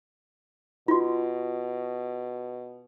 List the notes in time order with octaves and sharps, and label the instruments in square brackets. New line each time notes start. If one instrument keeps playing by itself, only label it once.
[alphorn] B2 [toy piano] F4 F#4